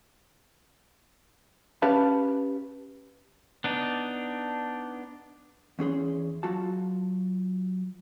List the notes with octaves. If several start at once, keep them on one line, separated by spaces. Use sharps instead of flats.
C#4 G4 B4 F5 A5
B3 D4 D#4
E2 C#4 G#4 C6
F#3 F4 F#4 A5